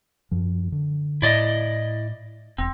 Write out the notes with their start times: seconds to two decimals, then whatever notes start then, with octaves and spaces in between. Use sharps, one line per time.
0.31 F#2 F3
0.72 D3
1.22 A2 E4 D5 D#5
2.58 E1 C4